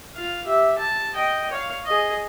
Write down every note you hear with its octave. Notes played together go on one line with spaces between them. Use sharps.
F4 F5
G4 E5
A5
D#5 G5
C#5 F5
G#4 D#5